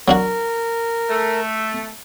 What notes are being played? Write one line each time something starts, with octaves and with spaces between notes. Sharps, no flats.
F#3 D4 F#4 A#4
A3